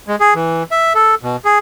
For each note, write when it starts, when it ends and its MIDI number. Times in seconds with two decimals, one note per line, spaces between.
0.08 0.16 56
0.20 0.34 68
0.35 0.63 52
0.71 0.93 76
0.95 1.15 69
1.23 1.36 47
1.45 1.59 68